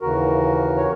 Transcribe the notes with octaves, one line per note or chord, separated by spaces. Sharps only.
D#2 C#3 E3 F#4 A#4
C#5